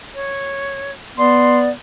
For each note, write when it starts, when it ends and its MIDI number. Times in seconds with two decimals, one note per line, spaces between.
0.15 0.92 73
1.18 1.72 59
1.18 1.70 74
1.18 1.58 84